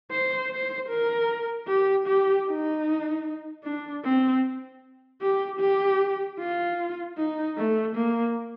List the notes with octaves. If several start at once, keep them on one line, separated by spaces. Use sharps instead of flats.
C5
C5
A#4
G4
G4
D#4
D4
C4
G4
G4
F4
D#4
A3
A#3